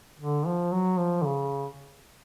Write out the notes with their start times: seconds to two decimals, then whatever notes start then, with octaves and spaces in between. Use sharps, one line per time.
0.20 D3
0.46 F3
0.73 F#3
0.99 F3
1.22 D3
1.26 C#3